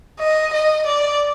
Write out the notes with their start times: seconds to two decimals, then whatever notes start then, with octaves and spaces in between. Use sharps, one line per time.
0.20 D#5
0.53 D#5
0.87 D5